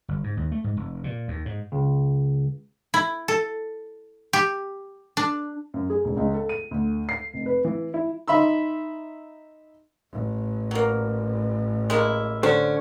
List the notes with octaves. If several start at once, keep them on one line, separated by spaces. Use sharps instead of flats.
G1
G#2
D#2
A3
G#2
F1
A#2
D#2
G#2
C#2
E4
A4
G4
D4
F#2
G#4
E1
C#2
A4
D#7
D2
C7
F1
B4
E3
E4
D#4 E5 B5 C6 E6
A1
F#3 A#3
G#3 A#3 E4
D3 C#4 A4 C5